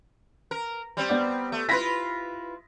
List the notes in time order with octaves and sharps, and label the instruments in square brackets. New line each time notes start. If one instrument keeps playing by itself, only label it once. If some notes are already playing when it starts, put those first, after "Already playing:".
[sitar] A#4
G3 C4
[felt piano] B3 D5
[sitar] A3
[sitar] E4 F4 B4 [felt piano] B5 A#6 B6